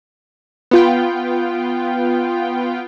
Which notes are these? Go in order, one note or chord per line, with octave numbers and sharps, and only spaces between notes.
B3 F4 G5